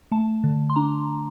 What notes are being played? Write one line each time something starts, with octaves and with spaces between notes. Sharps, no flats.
A3 A5
D3
C6
D4 A#5